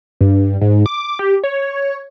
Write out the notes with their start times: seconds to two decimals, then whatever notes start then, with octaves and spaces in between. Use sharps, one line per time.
0.21 G2
0.61 G#2
0.86 D6
1.19 G4
1.44 C#5